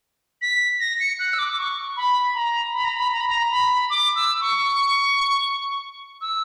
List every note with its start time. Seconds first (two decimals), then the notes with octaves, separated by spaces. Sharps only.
0.42 B6
0.80 A#6
1.00 C#7
1.19 F#6
1.33 E6
1.39 D6
1.53 D6
1.58 C#6
1.97 B5
2.35 A#5
2.74 B5
2.84 A#5
2.96 B5
3.13 A#5
3.20 B5
3.28 A#5
3.51 B5
3.90 D6
4.16 E6
4.41 C#6
6.21 E6